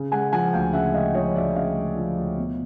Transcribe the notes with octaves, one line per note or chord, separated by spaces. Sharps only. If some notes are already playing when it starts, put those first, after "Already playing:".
Already playing: C#3
G#3 F#5 G#5
F3 F#5 G#5
D2 F5 G5
C#3 E5 F#5
G#3 D#5 F5
F3 C#5 D#5
D2 D5 E5
C#3 D#5 F5
G#3
F3
D2
B2